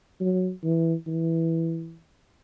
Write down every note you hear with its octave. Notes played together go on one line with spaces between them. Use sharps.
F#3
E3
E3